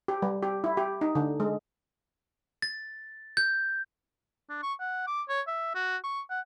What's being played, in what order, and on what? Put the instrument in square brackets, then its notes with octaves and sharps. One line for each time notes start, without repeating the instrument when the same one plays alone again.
[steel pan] G4
G3
G4
E4
G4
D#4
D3
G#3
[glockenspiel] A6
G6
[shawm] D4
C#6
F#5
D6
C#5
E5
F#4
C#6
F#5